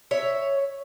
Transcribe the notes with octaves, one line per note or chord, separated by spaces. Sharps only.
C#5 E5